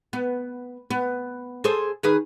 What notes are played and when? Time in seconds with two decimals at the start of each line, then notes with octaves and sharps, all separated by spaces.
0.13 B3
0.90 B3
1.64 G#4 A4 C5
2.03 D#3 G#4 B4